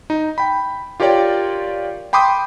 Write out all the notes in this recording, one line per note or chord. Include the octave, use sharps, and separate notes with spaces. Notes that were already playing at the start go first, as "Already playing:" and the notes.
D#4
G5 B5
F4 G4 A#4 C#5 D5 G5
G5 B5 C6 D6 D#6 G6